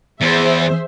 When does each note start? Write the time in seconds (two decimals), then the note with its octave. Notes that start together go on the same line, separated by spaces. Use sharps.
0.21 E2 G#4 C5 E5